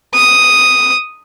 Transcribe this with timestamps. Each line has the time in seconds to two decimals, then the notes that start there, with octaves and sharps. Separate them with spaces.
0.15 D#6